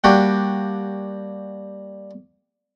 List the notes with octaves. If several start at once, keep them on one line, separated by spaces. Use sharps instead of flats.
G3 A#3 D4 F#4 G4